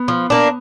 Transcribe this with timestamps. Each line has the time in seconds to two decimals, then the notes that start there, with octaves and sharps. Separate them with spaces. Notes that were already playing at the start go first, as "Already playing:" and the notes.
Already playing: B3
0.08 F3
0.30 A#3 D4